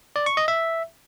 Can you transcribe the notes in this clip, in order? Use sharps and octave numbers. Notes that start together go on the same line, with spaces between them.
D5
C#6
D#5
E5